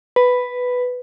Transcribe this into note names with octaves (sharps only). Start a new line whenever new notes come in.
B4